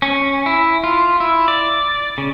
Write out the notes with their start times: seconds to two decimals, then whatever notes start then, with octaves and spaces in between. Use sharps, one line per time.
0.02 C#4
0.46 E4
0.84 F4
1.20 E4
1.48 D5
2.18 C#3